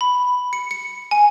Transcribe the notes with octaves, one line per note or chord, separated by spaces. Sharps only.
B5
C#7
C#7
G#5